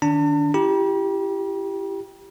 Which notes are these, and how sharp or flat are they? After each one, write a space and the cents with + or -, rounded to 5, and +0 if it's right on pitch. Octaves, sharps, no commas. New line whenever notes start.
D#3 -20 D4 -25 A5 +45
E4 +40 G4 +0 B5 -45